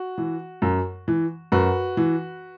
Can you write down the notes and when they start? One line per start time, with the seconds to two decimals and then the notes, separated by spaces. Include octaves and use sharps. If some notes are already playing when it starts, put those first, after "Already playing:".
Already playing: F#4
0.18 E3
0.62 F#2
1.08 E3
1.52 F#2 F#4 B4
1.97 E3